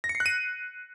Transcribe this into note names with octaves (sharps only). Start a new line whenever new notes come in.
A#6
C#7
C7
F#6
D#7